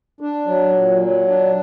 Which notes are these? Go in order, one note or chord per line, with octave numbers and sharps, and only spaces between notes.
D4
F#3
A#2
F#3
D4